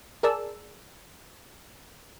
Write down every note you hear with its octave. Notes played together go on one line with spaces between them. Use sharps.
G#4 A#4 D5 A5 E6